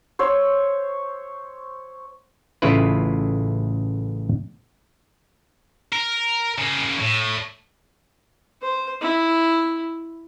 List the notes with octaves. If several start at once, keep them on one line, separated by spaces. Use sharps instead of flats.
C5 C#5 E6
A1 C#3 A3 E4 F4 B4
A#4
C#3 A#3
A2
C5
E4